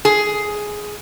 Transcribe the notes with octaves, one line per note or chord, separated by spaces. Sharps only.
G#4